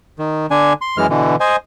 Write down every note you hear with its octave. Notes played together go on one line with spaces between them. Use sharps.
D#3
D3 D4 G#5
C6
F#2 E3 G#3 F6
B2 D3 E3
C5 D#5 G#5